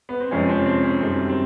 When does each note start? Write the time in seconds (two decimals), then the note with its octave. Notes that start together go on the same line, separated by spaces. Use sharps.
0.09 B3
0.20 C4
0.31 F2 C3 F3 G#3 C#4
0.49 C4
0.66 C4
0.83 C#4
1.01 F#2 D#3 G3 C4
1.29 C4